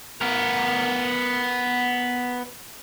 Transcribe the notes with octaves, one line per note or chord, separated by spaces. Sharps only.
B3 A#4